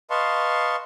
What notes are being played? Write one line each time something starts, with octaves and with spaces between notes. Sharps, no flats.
B4 D#5 F5 A5 C6 C#6